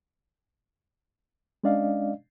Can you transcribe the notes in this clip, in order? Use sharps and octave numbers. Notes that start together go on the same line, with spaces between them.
G#3 C#4 D4 D5 D#5 F5